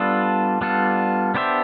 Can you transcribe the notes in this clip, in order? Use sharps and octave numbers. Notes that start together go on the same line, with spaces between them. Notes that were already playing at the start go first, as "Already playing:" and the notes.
Already playing: G3 B3 D4 F4 A4
G3 B3 D4 F4 A4
B3 D4 G4 C5 E5